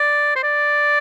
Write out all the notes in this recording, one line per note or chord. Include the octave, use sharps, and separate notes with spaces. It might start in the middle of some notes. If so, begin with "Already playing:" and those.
Already playing: D5
C5
D5